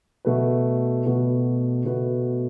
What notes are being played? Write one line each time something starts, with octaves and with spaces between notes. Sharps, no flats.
B2 A3 F#4 B4
B2 A3 F#4 B4
B2 A3 F#4 B4